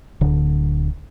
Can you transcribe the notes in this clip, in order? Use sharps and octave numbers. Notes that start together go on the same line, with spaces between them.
D1 D3